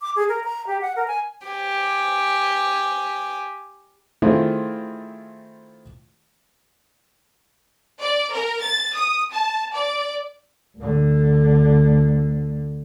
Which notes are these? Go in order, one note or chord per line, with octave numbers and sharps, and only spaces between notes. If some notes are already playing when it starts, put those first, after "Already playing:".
D6
G#4
A#4
A#5
G4
F#5
A#4
G#5
G4 G#5
D#3 A3 C4 E4 F4 G#4
D5
A#4
A6
D#6
A5
D5
D2 D3